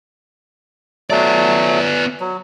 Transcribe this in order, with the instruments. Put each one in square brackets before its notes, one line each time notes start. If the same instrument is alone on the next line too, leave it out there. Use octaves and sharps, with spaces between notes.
[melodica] F#3 A3 [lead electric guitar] B3 D5
[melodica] F#3